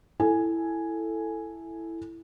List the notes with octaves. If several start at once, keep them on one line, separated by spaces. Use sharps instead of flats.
E4 A4 G#5